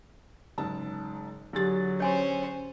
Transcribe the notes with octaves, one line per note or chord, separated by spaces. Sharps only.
F#1 G#2 A5
D3 F#3 E4 G4 G#4 A6
C#4 C5 C#5 G#5 C6